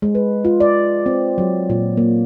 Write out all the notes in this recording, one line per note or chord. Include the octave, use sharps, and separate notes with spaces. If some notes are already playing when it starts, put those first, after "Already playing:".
G#3
B4
F4
D5
C4
F#3
A#2
A#3